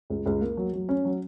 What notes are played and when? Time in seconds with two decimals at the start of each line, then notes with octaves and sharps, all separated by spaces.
0.10 C#2
0.26 C#2
0.41 A#3
0.57 F#3
0.73 F#3
0.89 C#4
1.05 F#3